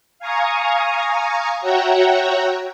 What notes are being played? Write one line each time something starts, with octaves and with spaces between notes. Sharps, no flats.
F5 G#5 A#5 C#6 D#6
F#4 C#5 E5 F#5 G5 A#5